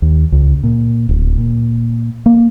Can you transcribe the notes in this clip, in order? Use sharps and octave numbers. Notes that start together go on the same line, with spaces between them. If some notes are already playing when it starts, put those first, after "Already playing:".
D#2
C#2
A#2
D1
A#2
A#3